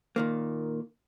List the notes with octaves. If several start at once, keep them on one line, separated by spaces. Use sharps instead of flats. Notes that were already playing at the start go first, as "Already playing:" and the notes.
A#2 D#3 A#3